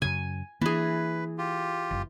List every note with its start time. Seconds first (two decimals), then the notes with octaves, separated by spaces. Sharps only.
0.02 F#2 C#3 G#5
0.61 E3 A#3 D4 G#4 B4
1.38 F4 G4
1.91 F#1